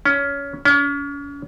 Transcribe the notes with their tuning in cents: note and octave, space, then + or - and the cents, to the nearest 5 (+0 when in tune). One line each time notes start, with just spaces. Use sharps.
C#4 +20
C#4 +40